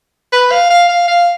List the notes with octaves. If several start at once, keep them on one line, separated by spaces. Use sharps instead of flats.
B4
F5
F5
F5
F5